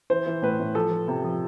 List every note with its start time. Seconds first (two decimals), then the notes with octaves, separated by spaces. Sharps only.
0.10 E3 C5
0.26 E3
0.42 A2 B4
0.60 A2
0.75 F3 A4
0.91 F3
1.08 C3
1.24 F3